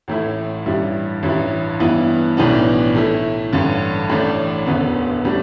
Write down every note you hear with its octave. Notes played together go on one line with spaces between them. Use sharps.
A1 A2 A3 E4
A1 G2 G3 E4
A1 G2 G3 E4
G2 E3 B3 E4
B1 A2 E3 B3 D4
A2 A3 E4
A1 G2 D3
A1 A2 A3 D4
E1 D2 D3 B3
A2 G3 D4